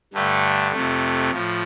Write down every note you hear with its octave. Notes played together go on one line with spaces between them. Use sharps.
G2 D3 A3
F2 C3 A3
A2 F3